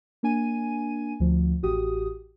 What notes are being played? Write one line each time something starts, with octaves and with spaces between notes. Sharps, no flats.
A#3 D4 G#5 D#7
D2 F3
A1 F#4 G4 D#6